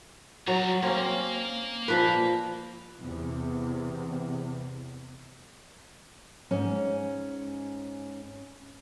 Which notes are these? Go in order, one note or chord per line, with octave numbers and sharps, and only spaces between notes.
F#3 G3 A#5
A#3 C4 C#4
A#2 F3 B4
E2 C3
G#2 C#4